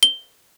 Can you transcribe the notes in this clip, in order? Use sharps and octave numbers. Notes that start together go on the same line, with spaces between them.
G7